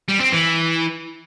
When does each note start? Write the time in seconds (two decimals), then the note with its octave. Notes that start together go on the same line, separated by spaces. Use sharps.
0.08 G3
0.20 C4
0.32 E3